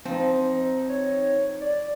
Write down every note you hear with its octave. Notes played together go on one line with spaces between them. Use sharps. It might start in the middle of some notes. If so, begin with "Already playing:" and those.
F3 C4 D#4
C#5
D5